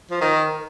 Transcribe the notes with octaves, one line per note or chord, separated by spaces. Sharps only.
F3
D#3 A#4